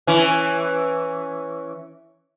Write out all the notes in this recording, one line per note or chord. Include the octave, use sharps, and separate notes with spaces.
E3 C#4